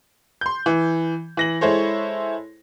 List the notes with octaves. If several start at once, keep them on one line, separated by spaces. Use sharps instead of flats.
C6 G6
E3
E3 A#6 F#7
G#3 E4 A4 C5 C#5